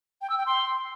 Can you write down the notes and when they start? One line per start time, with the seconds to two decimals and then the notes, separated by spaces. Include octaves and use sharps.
0.21 G5
0.30 E6
0.38 G5
0.46 C6